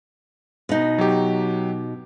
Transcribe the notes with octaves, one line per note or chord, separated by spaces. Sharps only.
B2 D#4
F#3 G4